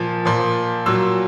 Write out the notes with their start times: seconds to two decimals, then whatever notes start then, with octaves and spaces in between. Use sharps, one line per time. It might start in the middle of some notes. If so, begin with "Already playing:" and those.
Already playing: A#2 F3
0.25 A#2 F3
0.86 A#2 F#3 E6